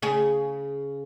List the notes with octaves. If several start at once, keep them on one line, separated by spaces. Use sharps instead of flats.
C#3 G#4